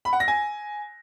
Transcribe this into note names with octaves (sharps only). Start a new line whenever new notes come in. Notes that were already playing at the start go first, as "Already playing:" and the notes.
B5
F#5
A#6
G#5